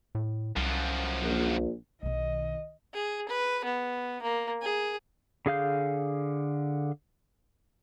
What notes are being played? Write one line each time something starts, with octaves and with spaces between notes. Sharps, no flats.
A2
C2 F#2 F3
A#1
B1 D#3 D#5
G#4
B4
B3
A#3
G#4
D3 G#4 F5 G6